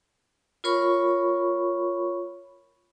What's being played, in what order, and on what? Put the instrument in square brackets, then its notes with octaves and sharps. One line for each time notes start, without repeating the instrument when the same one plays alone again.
[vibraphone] F4 A#4 C#5 B5 C#6